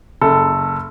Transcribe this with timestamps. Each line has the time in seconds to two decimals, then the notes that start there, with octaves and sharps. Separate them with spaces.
0.22 F#1 A4